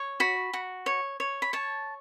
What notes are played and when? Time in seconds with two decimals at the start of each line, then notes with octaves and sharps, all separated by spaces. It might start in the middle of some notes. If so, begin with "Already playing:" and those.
Already playing: C#5
0.20 F#4 B5
0.53 F#4
0.86 C#5
1.20 C#5
1.42 B5
1.53 C#5 A5